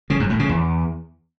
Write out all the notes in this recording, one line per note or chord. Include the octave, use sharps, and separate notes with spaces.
C#3
F#2
A2
C#3
E2